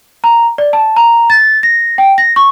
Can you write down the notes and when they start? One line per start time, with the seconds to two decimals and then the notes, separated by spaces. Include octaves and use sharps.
0.24 A#5
0.58 D5
0.73 A5
0.96 A#5
1.30 A6
1.63 A#6
1.98 G5
2.18 A#6
2.36 C#6